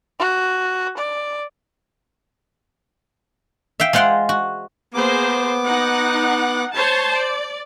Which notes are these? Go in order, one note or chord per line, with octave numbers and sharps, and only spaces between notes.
F#4
D5
E5 F5 G5
G#3 F4 C5 F#5 G5 C6
F#4
A#3 B3 G#4 C5 D6
D#4 F#5
C5 C#5 A5
D5